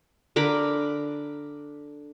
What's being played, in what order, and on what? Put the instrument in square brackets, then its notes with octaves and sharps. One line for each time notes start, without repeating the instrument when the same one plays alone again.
[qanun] D3 A#4 B5 D6